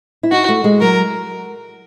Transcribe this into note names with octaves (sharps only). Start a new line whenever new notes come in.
E4
D#4 F#4
A3
G#3
F#3 A#4